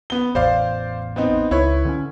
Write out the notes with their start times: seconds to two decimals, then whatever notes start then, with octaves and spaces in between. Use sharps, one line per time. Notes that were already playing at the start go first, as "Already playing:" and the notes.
0.10 B3 G7
0.35 A1 E2 C5 D5 F5
1.16 B3 C4 D#4
1.51 C#2 E4 B4 C#5
1.85 D3 B3 C#4